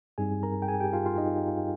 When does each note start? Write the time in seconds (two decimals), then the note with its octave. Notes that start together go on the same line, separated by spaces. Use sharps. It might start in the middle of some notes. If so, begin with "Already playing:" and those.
0.18 G2 G3 C4 D#4 G#4 G#5
0.43 A#4 A#5
0.62 G5
0.68 G#4 G#5
0.80 G4 G5
0.93 F4 F5
1.06 F4 F5
1.18 D#4 D#5